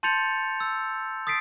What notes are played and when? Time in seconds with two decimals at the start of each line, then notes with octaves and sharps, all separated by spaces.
0.03 A5 C6 G6 A6 C#7 F7
0.60 E6
1.27 D#6 A6 B6 C7 D7